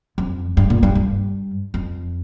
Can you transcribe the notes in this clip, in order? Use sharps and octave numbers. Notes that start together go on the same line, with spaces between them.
F2
G2
A#2
G2
G2
F2